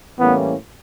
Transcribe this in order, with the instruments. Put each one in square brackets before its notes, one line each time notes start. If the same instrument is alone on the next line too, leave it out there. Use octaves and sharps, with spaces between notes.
[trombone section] A2 E3 G3 A#3 C#4 [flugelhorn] B3